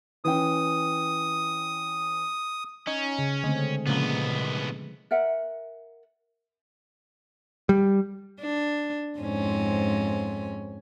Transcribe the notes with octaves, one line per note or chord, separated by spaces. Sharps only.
E3 C#4 G5 D#6
C#4 D#4
C#3
D3 G#3 A3 C4 G#4
C2 A#2 C#3 F3 G#3 A#3 B3 B4
A#4 E5 F#5
G3
D4
F2 G#2 C#4